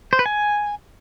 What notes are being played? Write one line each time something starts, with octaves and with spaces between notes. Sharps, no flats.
C5
B4
G#5